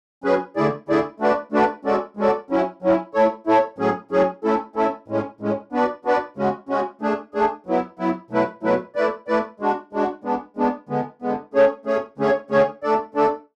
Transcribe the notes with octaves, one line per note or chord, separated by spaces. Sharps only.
F#3 C#4 G#4 B4
D3 A3 E4 G#4 D5
D3 A3 E4 G#4 D5
A3 D4 F#4 B4 D5
A3 D4 F#4 B4 D5
G#3 C#4 F#4 A4 D5
G#3 C#4 F#4 A4 D5
F#3 C#4 E4
F#3 C#4 E4
A3 E4 A4 C#5
A3 E4 A4 C#5
A2 F#3 C#4 G#4
A2 F#3 C#4 G#4
A3 C#4 E4 A4
A3 C#4 E4 A4
A2 G#3 C#4
A2 G#3 C#4
B3 D4 F#4 B4 D5
B3 D4 F#4 B4 D5
C#3 G#3 C#4 F#4
C#3 G#3 C#4 F#4
A3 D4 G#4
A3 D4 G#4
F#3 B3 E4
F#3 B3 E4
B2 F#3 A3 E4 B4
B2 F#3 A3 E4 B4
A3 E4 B4 D5
A3 E4 B4 D5
G#3 D4 F#4
G#3 D4 F#4
G#3 B3 D4
G#3 B3 D4
D3 G#3 B3
D3 G#3 B3
A3 C#4 G#4 C#5
A3 C#4 G#4 C#5
D3 A3 C#4 G#4 C#5
D3 A3 C#4 G#4 C#5
A3 D4 A4 D5
A3 D4 A4 D5